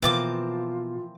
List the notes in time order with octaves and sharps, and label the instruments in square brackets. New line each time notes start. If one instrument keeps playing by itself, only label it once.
[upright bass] B2 [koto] E3 F3 A#3 [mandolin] C4 A5 D6 [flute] F4